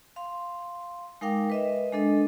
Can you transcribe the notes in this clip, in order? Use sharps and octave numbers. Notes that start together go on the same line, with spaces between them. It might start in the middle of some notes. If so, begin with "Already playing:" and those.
F5 C6
G#3 D#4 A#4 F5 G5 D6
B4 D#5 E5
G#3 D4 A4 D#5